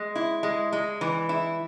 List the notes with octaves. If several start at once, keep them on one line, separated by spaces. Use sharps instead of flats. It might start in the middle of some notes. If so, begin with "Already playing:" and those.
Already playing: G#3
E4
G#3
G#3
E3
E4